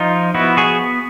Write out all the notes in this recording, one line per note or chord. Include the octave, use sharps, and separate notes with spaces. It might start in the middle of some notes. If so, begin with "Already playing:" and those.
Already playing: F3 D#4 F4
B3 E4 F#4
F#4 G#4